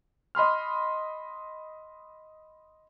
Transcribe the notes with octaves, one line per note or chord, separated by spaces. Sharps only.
D#5 B5 C6 F6